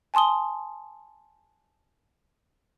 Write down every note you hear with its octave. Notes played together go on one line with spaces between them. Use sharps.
G#5 A5 C6 D#6 G7